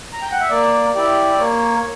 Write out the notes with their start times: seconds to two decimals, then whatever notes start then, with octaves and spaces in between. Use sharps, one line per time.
0.13 A#5
0.22 G5
0.32 F#5
0.40 E5
0.49 A#3 D5
0.95 E4 G4 D5
1.39 A#3 C#5